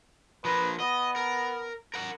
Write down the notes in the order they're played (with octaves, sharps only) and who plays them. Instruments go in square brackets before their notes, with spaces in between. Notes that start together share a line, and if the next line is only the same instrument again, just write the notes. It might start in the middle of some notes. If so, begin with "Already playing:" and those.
[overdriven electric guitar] F3 A#4 [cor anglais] B4
[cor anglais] B3 [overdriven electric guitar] D#5
[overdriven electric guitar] A#4
A#4 F#5